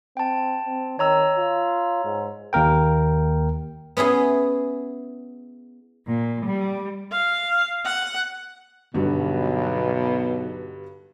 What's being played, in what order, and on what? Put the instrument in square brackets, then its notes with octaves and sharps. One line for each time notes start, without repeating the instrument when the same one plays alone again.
[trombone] C4 [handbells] G5 A5
[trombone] C4
[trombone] D#3 [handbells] C#5 A#5 E6
[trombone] F4
G#2
[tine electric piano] D#2 A#3 A#4 G5
[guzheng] B3 C#4 E4 G#4
[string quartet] A#2
G3
[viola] F5
F#5
[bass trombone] B1 [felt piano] G2 D3 F#3 [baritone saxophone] B2